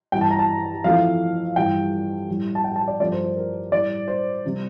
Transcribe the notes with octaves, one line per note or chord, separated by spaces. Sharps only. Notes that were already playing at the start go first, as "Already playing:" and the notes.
G2 E3 G3 G5
A5
A#5
A5
F2 E3 A3 F5
G2 E3 G3 G5
A2 G3
A5
G5
A5
D5
G2 F3 A3 D5
C5
C5
A#4
A2 G3 D5
C5
C3 G3